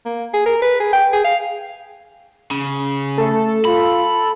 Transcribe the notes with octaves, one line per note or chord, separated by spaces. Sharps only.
A#3
G#4
A#4
B4
G#4
G5
G#4
F5
C#3
A3 A4
F4 B5